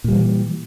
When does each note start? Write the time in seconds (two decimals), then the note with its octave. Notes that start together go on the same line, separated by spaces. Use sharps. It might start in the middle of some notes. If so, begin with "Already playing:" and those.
0.04 A#2
0.08 G3
0.12 E3